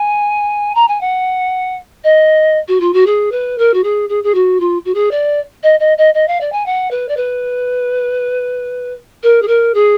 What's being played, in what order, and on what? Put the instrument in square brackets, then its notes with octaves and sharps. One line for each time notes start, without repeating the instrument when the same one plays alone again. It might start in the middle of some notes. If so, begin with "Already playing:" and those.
Already playing: [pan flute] G#5
A#5
G#5
F#5
D#5
F#4
F4
F#4
G#4
B4
A#4
F#4
G#4
G#4
G#4
F#4
F4
F#4
G#4
D5
D#5
D#5
D#5
D#5
F5
D5
G#5
F#5
B4
D5
B4
A#4
G#4
A#4
G#4